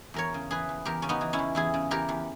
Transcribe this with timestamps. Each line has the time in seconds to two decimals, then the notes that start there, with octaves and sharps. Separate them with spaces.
0.14 E2 A#4 C#5
0.34 C#3
0.51 E3 G#4 B4
0.69 E2
0.85 E2 G4 A#4
1.02 C#3 C#4
1.09 B3 D#4
1.21 E3
1.33 C#4 E4
1.39 E2
1.55 E2 E4 G#4
1.74 C#3
1.91 E3 G4 A#4
2.09 E2